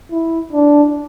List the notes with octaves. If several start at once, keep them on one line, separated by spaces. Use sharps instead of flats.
E4
D4